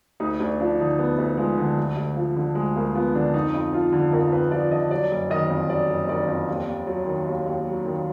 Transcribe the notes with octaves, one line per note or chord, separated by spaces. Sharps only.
D2 D#4
D2 D4
F3 D4
D3 D#4
D2 B3
D2
F3 G#3
D3
D2
D2
F3
D3
D2 G#3
D2 A#3
F3 B3
D3 D4
F2 D#4
F2
F3 F4
D3
F2 A#4
F2 B4
F3 D5
D3 D#5
F#3 D5
F#1
D#3 D#5
F2
F#3 D5
F#1
D#3 D5
F2
D#2
D#2
F#3
D#3
D#2
D#2
F#3
D#3